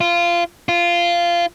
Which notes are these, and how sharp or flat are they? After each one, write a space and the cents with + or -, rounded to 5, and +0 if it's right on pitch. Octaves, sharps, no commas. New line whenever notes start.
F4 -20
F4 -15